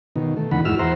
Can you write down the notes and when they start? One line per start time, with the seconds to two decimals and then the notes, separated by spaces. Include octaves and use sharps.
0.16 B2 D#3
0.37 A3
0.51 E2 B2 D3 D#3 F#5 B5
0.65 D#2 G#2 E4 F#4 E6 F6
0.79 E2 C5 E5 F#5 A#5 C6